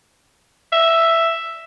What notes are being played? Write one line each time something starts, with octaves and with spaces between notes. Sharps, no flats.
E5